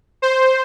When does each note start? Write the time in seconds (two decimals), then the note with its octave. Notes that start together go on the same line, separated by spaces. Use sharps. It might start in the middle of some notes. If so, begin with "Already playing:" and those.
0.22 C5